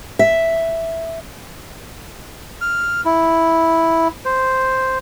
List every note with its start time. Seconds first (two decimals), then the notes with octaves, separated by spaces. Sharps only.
0.19 E5
2.61 F6
3.05 E4
4.25 C5